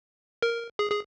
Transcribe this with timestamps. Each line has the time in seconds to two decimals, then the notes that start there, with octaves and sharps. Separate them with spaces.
0.42 A#4
0.79 G#4
0.92 G#4